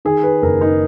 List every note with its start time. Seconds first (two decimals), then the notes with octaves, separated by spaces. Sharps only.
0.05 D#3 G#4
0.23 B4
0.42 F#1 A#4
0.61 D#4